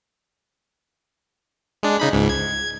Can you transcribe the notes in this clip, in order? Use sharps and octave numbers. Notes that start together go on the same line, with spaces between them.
G#3 D4
C#3 D#4 B5
C#2 G#2
G#6